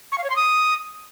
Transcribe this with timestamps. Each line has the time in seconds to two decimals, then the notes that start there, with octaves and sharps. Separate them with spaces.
0.12 C#6
0.18 F5
0.24 C#5
0.30 C6
0.36 D#6